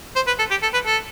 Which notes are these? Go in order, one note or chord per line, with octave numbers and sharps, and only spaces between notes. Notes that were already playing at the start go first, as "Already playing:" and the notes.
C5
B4
A4
G4
A4
B4
A4